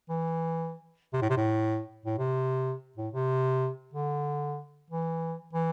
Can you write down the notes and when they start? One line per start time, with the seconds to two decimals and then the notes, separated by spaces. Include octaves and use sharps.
0.09 E3
1.13 C3
1.22 A2
1.30 C3
1.37 A2
2.06 A2
2.18 C3
2.98 A2
3.14 C3
3.94 D3
4.90 E3
5.53 E3